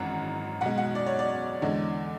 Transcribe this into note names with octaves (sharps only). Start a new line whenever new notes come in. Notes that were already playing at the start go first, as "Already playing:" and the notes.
Already playing: G#1 F#2 E3 G#3 F#5
B1 B2 G#3 F#5
F#5
D5
C#5
D5
E2 D3 G#3